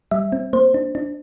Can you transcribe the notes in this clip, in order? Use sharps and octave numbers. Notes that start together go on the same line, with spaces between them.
G3 E5
C4
A#3 C5
D4
D4